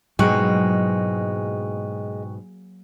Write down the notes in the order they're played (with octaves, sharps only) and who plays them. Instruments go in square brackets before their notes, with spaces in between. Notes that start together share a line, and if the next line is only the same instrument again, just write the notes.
[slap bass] G#2 B2 [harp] F#3 A#3 [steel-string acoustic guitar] G#3 [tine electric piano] G5 C#6 F#6